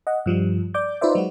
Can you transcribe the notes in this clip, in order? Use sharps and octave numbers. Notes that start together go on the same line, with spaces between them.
D#5 F#5
G2 F3 G3
D5 D6 G6
D#4 F4 B4 C5 D5 E5
F#3 G#3 F#4